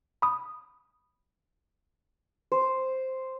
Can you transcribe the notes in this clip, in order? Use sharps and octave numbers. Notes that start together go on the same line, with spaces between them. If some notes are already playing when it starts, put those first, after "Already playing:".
B5 D#6
C5